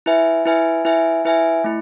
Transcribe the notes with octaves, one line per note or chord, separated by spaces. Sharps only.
E4 B4 E5 G#5
E4 B4 E5 G#5
E4 B4 E5 G#5
E4 B4 E5 G#5
A3 E4